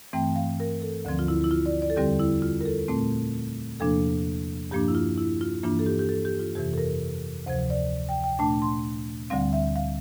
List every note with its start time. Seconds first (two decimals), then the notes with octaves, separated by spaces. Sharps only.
0.13 G2 E3 A3 C4 G5
0.36 F5
0.60 A#4
0.82 A4
1.05 D2 D3 F3 C4
1.19 F4
1.28 E4
1.44 E4
1.51 F4
1.66 D5
1.82 D5
1.90 A4
1.96 E2 D3 G3 C4 G4
2.20 E4
2.42 F4
2.61 A#4
2.66 A4
2.88 A#2 A3 C4
3.80 E2 C3 F3 A#3 D4 A4
4.71 G2 F3 A#3 D4 G4
4.88 E4
4.95 F4
5.17 E4
5.41 F4
5.63 G2 E3 A#3 D4 F4
5.79 A4
5.86 G4
5.99 G4
6.09 A4
6.25 G4
6.39 F4
6.55 F2 C3 E3 G4
6.74 A4
6.78 A#4
7.46 D2 C3 F3 C5
7.70 D5
8.09 G5
8.24 G5
8.39 A#2 A3 D4 A5
8.62 C6
9.30 D2 D3 G3 C4 F5
9.53 E5
9.76 F5